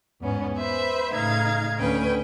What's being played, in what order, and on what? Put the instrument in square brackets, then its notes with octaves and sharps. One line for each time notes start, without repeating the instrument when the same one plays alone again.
[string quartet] E2 G#2 B3 C#4
B4 C5 E5 B5
A2 C#3 D#4 F5 A#5 G#6
D2 C#4 B4 G5